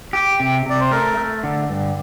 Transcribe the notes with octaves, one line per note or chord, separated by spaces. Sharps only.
G4
C3
C3 D5
C5
A3 A#4
A3
D3
G2